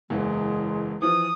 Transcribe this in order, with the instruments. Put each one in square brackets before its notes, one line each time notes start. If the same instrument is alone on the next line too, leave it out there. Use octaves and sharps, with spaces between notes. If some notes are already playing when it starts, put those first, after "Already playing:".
[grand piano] F#1 E2 E3 [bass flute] G#3
[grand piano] E3 F3 [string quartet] D#6